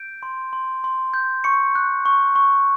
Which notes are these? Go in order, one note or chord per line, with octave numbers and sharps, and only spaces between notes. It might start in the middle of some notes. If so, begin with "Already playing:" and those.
Already playing: G6 D7
C6
C6
C6
G6
C#6 C#7
F#6
C#6
C#6